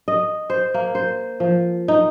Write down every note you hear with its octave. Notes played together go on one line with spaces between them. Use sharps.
D#5
C5
A#3
C5
F3
D#4